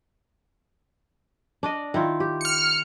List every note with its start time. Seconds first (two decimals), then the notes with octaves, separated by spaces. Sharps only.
1.63 D4 D5 D#5
1.94 D#3 E4 F4
2.20 G4
2.41 F6 C#7